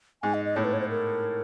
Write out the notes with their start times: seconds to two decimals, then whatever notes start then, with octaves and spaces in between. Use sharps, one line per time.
0.22 G#2 G#5
0.34 D#5
0.45 D#5
0.56 A2 C#5
0.64 B4
0.73 C#5
0.80 C5
0.89 A#4